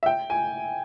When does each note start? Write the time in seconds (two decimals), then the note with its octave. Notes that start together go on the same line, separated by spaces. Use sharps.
0.03 E5
0.06 G5
0.30 G#5